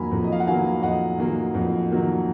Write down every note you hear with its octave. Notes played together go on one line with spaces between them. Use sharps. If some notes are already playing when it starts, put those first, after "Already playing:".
Already playing: F2 D#3 F#3 A#3 G#5 A#5 B5
F2
D#5
F5
F#5
D#3 F#3 A#3 F5 G#5
F2 D#5 F#5
D#3 F#3 A#3
F2
D#3 F#3 A#3